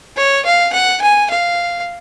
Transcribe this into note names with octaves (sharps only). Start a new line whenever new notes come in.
C#5
F5
F#5
G#5
F5